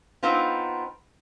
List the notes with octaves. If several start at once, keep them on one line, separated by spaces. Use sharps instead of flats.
B3 C4 D#4 F4